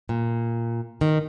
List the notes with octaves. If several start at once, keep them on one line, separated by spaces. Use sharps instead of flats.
A#2
D#3